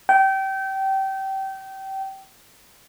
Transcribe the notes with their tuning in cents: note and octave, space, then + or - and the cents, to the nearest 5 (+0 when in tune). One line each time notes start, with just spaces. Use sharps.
G5 -25